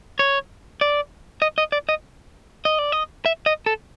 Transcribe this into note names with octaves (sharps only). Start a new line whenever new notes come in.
C#5
D5
D#5
D#5
D5
D#5
D#5
D5
D#5
E5
D#5
A4